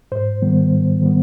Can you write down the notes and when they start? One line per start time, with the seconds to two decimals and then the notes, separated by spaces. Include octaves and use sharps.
0.12 G#2 C5
0.42 D#3 G3 B3
0.71 G#2
1.01 D#3 G3 B3